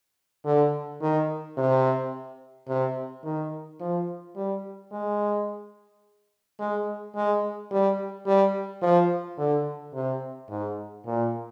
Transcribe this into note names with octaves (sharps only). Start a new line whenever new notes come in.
D3
D#3
C3
C3
D#3
F3
G3
G#3
G#3
G#3
G3
G3
F3
D3
C3
G#2
A#2